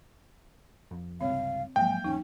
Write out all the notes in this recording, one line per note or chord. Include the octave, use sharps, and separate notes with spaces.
F2
C#2 G2 C3 C4 C#5 F5
G#2 F3 F#3 A#3 G5 G#5
G#1 E2 C#4 D#4